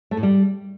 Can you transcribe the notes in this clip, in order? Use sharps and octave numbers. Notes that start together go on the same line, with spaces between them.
A3
A2
G3